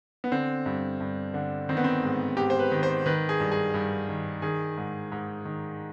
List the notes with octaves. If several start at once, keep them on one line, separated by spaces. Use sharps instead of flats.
B3
D3 C4
G2
G2
D3
D#3 C4
B3
C4
G#2
G#2 G4
C5
B4
D#3
C5
D#3 B4
G#4
G2
G#4
G2
D#3
D#3 G#4
G#2
G#2
D#3